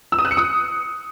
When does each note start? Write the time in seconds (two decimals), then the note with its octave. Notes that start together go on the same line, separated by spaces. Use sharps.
0.12 E6
0.18 D#6
0.25 F#6
0.31 C#7
0.37 D#6